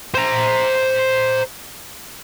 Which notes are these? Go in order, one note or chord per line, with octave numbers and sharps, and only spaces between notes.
C5 A#5